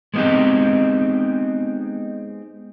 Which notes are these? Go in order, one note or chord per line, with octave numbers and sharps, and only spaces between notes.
G#3 B3 C4 D#4 G4